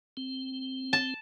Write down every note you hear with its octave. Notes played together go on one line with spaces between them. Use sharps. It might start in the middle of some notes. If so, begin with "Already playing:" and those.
C4
A5